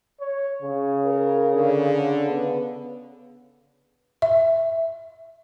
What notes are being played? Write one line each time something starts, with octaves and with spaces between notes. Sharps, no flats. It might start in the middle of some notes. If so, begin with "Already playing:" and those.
C#5
C#3
A#4
D3
B3
E5